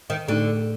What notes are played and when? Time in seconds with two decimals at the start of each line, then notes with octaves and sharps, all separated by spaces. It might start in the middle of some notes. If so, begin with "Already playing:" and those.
0.10 D#3
0.28 A2 D3 A3 D#4